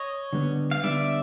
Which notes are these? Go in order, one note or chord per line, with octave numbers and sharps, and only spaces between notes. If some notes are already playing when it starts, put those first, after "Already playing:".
Already playing: C#5 D#5
D3 G3 B3 D4
F5
D3 G3 B3 D4 D5 E5